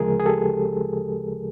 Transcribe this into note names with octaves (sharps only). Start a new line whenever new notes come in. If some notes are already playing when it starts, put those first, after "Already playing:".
Already playing: D2 C#3 F3 G#3 G#4 A#4
G#4
G4 A4